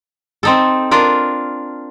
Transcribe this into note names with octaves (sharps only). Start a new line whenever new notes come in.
C4 D#4 A4
D4 F4 A#4